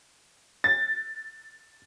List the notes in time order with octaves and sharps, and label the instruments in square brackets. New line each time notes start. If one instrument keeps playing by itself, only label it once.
[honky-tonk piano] A6